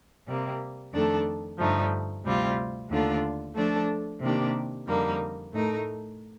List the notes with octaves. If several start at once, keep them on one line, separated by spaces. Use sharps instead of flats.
C3 G3 A#3
F2 D#3 A3 D4 A4
G2 D3 F3 A3 D#4
D2 C3 G3 C4 F4
D#2 D3 A3 D4 F4
F3 A3 D4 A4
C3 D#3 A#3 D4 G4
F2 D3 G3 A#3 D#4
A2 A3 D#4 A#4